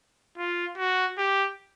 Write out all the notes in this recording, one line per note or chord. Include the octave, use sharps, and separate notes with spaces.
F4
F#4
G4